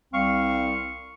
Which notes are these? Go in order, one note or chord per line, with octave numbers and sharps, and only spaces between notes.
C2 G3 C4 F5 C#6